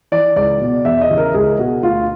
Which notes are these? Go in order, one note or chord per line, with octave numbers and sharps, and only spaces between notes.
E3 D5
C#2 D5
B2
E2 E5
D#5
C#3 E3
A#4
C#2 G#4
B2 F#4
D2 F4